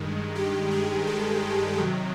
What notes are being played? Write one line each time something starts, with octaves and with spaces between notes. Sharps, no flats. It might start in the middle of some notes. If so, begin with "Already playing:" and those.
Already playing: G2 D#3 G#3
G4
G#4
A4
C3 D#3 F#3